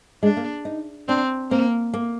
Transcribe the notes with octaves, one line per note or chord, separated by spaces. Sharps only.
G#3 D4
A#3
D#4
C4 D4
A#3 C4
A#3